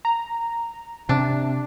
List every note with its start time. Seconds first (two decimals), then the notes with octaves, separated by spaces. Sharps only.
0.05 A#5
1.09 C3 D4